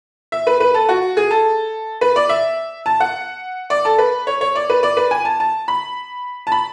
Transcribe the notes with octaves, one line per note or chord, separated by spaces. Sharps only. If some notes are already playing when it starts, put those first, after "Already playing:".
E5
B4
B4
A4
F#4
G#4
A4
B4
D5
E5
A5
F#5
D5
A4
B4
C#5
C#5
D5
B4
D5
B4
G#5
A5
A5
B5
A5
B5